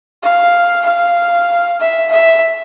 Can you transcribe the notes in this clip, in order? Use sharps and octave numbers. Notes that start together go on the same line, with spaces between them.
F5
F5
E5
E5